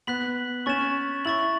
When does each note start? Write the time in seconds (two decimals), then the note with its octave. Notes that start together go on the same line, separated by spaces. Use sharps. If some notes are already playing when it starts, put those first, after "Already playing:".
0.07 B3 F#6 B6 F#7
0.66 C#4 C#6 A6 E7
1.25 E4 C#6 A6 F#7